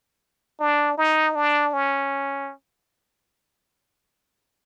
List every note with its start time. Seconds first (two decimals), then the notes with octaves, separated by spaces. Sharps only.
0.60 D4
0.97 D#4
1.35 D4
1.73 C#4